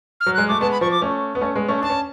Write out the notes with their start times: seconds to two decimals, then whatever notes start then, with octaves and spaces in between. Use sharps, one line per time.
0.21 F6
0.26 F#3
0.34 G#3 F#6
0.48 A3 D6
0.60 G#3 B3 A5
0.71 B5
0.81 F3 C#6
0.91 D6
1.02 A3 C#4
1.35 B3
1.41 A3 C#4
1.55 G#3 B3
1.68 A3 C#4
1.81 D4 A5
1.90 C#4